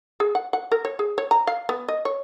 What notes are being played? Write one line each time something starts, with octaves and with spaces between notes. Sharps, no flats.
G#4
F#5
F#5
A#4
C#5
G#4
C#5
A#5
F5
B3
D#5
C#5